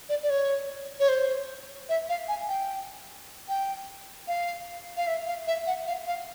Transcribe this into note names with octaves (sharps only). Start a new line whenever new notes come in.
D5
D5
C#5
C#5
C5
E5
F5
G#5
G5
G5
F5
F5
E5
F5
E5
F#5
F5
F5